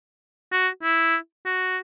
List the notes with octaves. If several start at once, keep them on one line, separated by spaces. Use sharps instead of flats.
F#4
E4
F#4